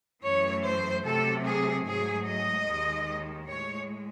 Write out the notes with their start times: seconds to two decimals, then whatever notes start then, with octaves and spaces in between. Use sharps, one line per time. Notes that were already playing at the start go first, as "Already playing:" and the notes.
0.23 F#2 E3 A3 C#5
0.63 C5
1.04 C3 F#3 A3 A4
1.45 G#4
1.86 G#2 F#3 A3 G#4
2.27 D#5
2.68 D#2 D#3 G#3
3.49 A2 G#3 C#5